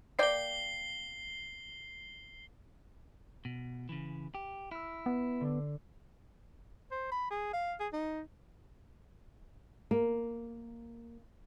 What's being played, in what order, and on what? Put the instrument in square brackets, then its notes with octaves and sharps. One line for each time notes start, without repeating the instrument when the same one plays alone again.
[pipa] A#3 D5 G5 [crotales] C7 G7
[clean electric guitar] B2
C#3 E3
G4
[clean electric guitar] E4 [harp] E6 F6
[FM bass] B3
[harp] D3 D4
[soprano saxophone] C5
B5
G#4
F5
G#4
D#4
[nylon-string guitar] A#3